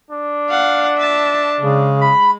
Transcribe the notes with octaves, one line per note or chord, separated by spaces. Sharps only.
D4
F5 F#5
E5 A5
C#3 G#3
B5